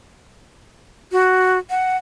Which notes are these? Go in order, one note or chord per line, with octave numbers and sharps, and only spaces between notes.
F#4
F#5